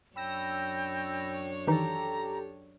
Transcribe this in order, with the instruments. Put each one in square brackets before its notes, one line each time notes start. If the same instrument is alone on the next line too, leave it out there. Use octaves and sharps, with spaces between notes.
[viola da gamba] F#2 D4 C#5 [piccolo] G5 [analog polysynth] B5 E6 A#6
[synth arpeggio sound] D#3 E3 D#4 [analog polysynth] G4 A4 [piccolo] A#5